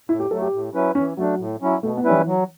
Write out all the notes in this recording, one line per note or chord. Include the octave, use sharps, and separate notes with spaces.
A2 E4
G4
F#3 A3 A4
G4
A2
F#3 C#4 E4 B4
E3 C#4
F#3 A3 D4
A2
F#3 C#4 E4
B2 A3
B3
G3 C#4 E4 B4
E3
F#3